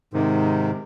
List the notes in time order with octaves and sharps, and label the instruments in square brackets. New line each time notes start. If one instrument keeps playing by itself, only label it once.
[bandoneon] G#2 C3 D#3